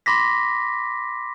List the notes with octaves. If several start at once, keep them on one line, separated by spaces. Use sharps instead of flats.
B5 C6 D6 A#6 B6